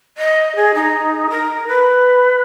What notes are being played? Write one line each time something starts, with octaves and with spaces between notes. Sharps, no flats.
D#5
G#4
D#4
A#4
B4